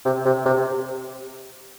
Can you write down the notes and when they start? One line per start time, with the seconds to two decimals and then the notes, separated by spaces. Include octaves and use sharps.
0.05 C3
0.25 C3
0.45 C3